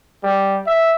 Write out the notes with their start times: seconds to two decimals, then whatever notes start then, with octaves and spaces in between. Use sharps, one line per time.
0.23 G3
0.66 E5